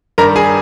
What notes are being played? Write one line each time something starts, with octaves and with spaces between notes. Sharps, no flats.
G2 D#3 G3 A#4 A#5
G#4 G#5